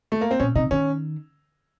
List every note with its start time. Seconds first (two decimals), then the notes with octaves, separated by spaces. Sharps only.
0.12 A3
0.21 A#3
0.31 C4
0.40 A#2 C#4
0.55 C3 D#4
0.71 D#3 C#4